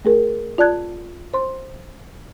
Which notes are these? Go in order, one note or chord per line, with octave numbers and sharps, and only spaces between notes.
A3 G#4 A#4
F4 D5 A5 F#6 G#6
C5 C6